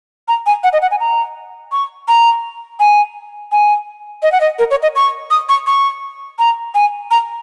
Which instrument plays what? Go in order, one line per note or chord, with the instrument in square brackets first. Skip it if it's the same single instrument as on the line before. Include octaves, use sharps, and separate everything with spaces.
[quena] A#5
G#5
F#5
D#5
F#5
G#5
A#5
C#6
A#5
G#5
G#5
D#5
F#5
D#5
A#4
C#5
D#5
C#6
D#6
C#6
C#6
A#5
G#5
A#5